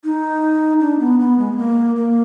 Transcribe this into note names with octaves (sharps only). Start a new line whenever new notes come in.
D#4
D4
B3
B3
G#3
B3
A#3
A#3